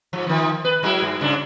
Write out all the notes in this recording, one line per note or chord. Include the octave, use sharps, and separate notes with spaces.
G#2 F3
D#3 F3
B4
F#3 G#3 E4
G2
G#2 C#3 D4